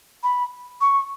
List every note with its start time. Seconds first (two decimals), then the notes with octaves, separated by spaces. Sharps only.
0.23 B5
0.81 C#6